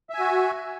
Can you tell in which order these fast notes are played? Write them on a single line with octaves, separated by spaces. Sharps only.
E5 G#5 F#4